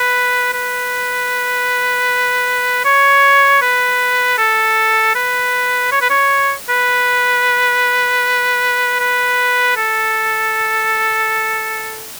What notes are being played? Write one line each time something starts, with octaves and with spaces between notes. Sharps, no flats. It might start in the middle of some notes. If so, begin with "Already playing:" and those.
Already playing: B4
B4
C#5
B4
A4
B4
C#5
B4
C#5
B4
B4
A4